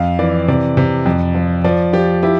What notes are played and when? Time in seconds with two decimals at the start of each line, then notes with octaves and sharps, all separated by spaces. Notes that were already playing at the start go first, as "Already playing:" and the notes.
Already playing: F2 F5
0.19 E3 D5
0.48 C3 D5
0.77 C3
1.06 F2
1.35 F3
1.64 F3 D5
1.93 F3 G4
2.23 E4 G4